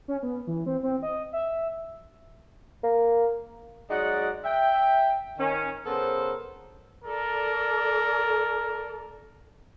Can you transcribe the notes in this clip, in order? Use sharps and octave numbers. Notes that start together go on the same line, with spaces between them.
C#4
B3
E3
C4
C4
D#5
E5
A#3
F#3 G#3 D#4 F#4 D5 F#5
E5 G5
D#3 C#4
C#3 B3 A4 A#4 C5
A4 A#4 D5